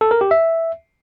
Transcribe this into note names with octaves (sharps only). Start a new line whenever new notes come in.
A4
A#4
G4
E5